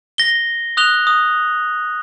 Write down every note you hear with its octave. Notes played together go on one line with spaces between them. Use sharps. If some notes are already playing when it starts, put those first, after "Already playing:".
A#6 G7
D#6 F#6 F7 G7
D#6